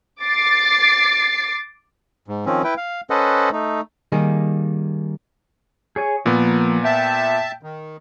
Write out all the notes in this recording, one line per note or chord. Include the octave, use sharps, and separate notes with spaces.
D6 A6 C7
G#2
D#3 F3 C4 C#4
E4 B4 G5
F5
C#4 A4 B4 C5 D#5 F#5
A3 D#4
D#3 G3 A#3 D#4 G#4
G#4 C#5 G#5
A#2 F3 A#3 B3
E5 G5 A5
D#3